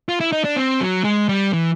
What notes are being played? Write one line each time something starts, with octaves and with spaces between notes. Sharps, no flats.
F4
E4
D#4
D4
C4
F#3
G#3
G3
E3